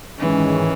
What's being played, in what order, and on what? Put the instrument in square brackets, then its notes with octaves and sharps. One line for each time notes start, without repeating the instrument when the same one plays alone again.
[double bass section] G#2 D#3 G#3 C#4 [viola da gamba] E3